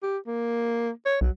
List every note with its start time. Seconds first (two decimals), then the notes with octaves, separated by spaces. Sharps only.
0.03 G4
0.27 A#3
1.06 C#5
1.21 B1 F#3